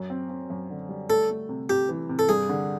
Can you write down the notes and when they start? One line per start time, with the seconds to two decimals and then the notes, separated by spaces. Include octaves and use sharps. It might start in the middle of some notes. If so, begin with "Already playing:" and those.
Already playing: F#2
0.10 C4
0.29 C4
0.50 F#2
0.70 D3
0.89 G3
1.09 A3 A4
1.29 A3
1.49 C3
1.69 C3 G4
1.89 E3
2.09 C3
2.19 A4
2.29 G2 G#4
2.49 D3